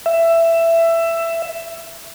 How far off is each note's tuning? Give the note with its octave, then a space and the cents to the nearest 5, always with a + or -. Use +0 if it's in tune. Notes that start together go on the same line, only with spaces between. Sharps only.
E5 +15